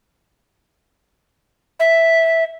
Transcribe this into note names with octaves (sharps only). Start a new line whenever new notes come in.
E5